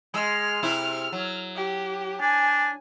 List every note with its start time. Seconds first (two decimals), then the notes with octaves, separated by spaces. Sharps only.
0.14 G#3 F6
0.63 C3 E4
1.12 F#3
1.56 G4
2.21 D4 G#5